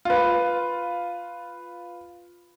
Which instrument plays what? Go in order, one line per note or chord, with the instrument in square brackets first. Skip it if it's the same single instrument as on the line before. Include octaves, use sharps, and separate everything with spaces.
[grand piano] F4 B4